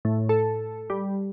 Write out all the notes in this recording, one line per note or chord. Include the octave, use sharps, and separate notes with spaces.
A2
A4
G3